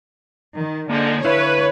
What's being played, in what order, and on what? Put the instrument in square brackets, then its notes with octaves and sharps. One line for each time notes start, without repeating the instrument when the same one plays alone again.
[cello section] D#3
[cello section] D3 [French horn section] F3 G#3 D#4 [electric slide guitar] A#3
[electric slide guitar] D3 E4 F5 [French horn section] B4 [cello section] C#5